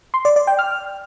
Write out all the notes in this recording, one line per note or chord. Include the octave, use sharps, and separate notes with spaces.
C6
D5
D5
G5
F6